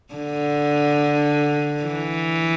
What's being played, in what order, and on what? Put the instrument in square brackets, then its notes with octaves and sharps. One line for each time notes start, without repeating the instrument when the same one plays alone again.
[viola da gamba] D3
E3